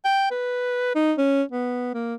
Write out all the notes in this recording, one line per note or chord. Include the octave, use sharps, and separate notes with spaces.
G5
B4
D#4
C#4
B3
A#3